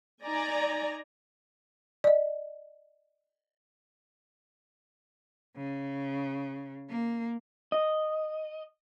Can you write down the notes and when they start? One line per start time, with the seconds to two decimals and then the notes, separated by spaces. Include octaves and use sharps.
0.24 D#4 D5 G#5 A#5
2.04 D5 D#5
5.57 C#3
6.90 A#3
7.72 D#5